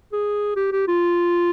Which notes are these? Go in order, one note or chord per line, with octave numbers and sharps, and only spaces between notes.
G#4
G4
G4
F4